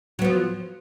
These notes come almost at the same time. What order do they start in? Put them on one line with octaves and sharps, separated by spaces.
F#3 B3 F3